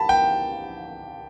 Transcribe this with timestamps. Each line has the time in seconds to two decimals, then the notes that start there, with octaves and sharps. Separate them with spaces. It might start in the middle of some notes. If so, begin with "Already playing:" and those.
Already playing: A5 B5
0.09 G5